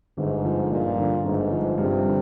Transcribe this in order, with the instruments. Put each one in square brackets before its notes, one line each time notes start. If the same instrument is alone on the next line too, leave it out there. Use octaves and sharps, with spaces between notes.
[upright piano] G1 [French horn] G#2
[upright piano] F3
[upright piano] G2 [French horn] A#2
[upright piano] D3
[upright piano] G1 [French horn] G#2
[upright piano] F3
[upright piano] G2 [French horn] C3
[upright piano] D3